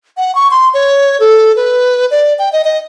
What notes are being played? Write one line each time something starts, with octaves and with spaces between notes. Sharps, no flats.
F#5
C#6
C6
C#5
A4
B4
D5
G5
D#5
D#5